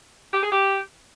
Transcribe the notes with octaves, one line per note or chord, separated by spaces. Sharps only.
G4
G#4
G4